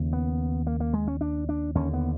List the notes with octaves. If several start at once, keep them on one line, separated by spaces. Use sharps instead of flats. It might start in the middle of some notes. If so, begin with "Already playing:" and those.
Already playing: D#2 C#3
B3
A#3
A#3
G#3
C#4
D4
D4
D#2 D3 C#4
B3